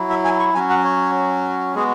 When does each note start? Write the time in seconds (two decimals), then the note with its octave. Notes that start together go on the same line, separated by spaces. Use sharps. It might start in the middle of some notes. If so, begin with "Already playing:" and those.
Already playing: F#3 E4
0.10 E5
0.25 G#5
0.39 C#6
0.54 F#3 C#4 F#4 G#5
0.70 F#5
0.84 C#5
1.75 G#3 B3 F#4 G#4